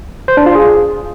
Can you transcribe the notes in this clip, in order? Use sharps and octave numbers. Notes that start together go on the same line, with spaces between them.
C5
D4
F4
G#4